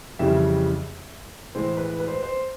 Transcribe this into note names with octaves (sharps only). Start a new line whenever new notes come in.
F2 C#3 E3 G3 E5
A2 E3 G#3 C5
B4
B4
C5
B4
C5